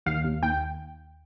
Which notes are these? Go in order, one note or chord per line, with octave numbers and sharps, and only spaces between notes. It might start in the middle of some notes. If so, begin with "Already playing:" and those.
D#2 F5
D#2
D#2 G5